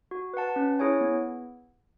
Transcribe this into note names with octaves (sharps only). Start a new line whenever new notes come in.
F#4
B4 F#5 A5
C#4
E4 G#4 C#5 G#5
B3